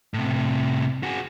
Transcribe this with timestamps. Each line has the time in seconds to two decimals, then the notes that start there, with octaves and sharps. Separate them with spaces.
0.14 A2 C3
1.03 F#4 G#4